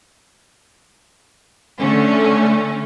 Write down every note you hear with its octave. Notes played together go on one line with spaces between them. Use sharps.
D3 A3 C#4